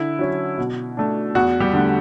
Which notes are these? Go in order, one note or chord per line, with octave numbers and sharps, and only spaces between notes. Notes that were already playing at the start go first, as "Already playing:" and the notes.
Already playing: D3 E4
F#3 C#4
B2
A3 D4
E2 F#4
G3 G4
D3 A3